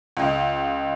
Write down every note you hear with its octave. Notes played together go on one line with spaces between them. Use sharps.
C#2 D#5